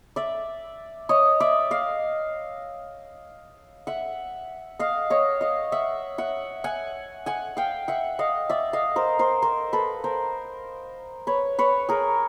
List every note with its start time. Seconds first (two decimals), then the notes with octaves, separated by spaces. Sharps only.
0.16 D5 E5
1.09 C#5 D#5
1.40 D5 E5
1.71 D#5 F5
3.87 E5 F#5
4.79 D#5 F5
5.10 C#5 D#5
5.41 D#5 F5
5.72 E5 F#5
6.18 E5 F#5
6.64 F#5 G#5
7.26 F#5 G#5
7.57 F5 G5
7.88 E5 F#5
8.19 D#5 F5
8.50 D5 E5
8.73 D#5 F5
8.96 A#4 C5
9.19 A#4 C5
9.42 A#4 C5
9.73 A4 B4
10.04 A#4 C5
11.27 B4 C#5
11.59 B4 C#5
11.89 G#4 A#4